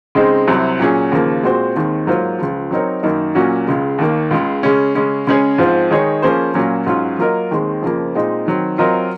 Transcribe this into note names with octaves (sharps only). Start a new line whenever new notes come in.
C#3 G#3 C4 D#4
C2 C3 F#3
A#2 F#3 C#4 G#4
D#2 C#3 F3 A#3
A#2 G#3 C4 F#4 C5
D#2 D#3 G#3 C4
G#2 F#3 A#3 F4 C5
C#2 C#3 F3
F#3 C4 D#4 A#4 C#5
F#2 D#3 A#3 D#4
A#2 F#3 A#3 C#4 F#4
C#2 C#3 G#3
D#2 D#3 A#3
C#2 C#3 G#3
C#3 G#3 C#4
C#3 G#3 C#4
C#3 G#3 C#4 G#4 C#5
G#2 F3 C4 F4 C5
D#3 G#3 D#4 G#4 C#5
F3 A#3 C#4 G#4 C5
A#2 F#3 A#3 C#4 F4
G#2 F#3 C#4 F4
F#3 A#3 F4 A#4 D#5
D#2 D#3 G#3 C4
F2 C#3 F3 A#3
A#2 G#3 C4 D#4
D#3 F#3 C4
F#3 C4 F4 A#4 D#5